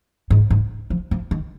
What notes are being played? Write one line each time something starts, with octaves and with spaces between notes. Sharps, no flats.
G#2
G#2
F3
F3
D#3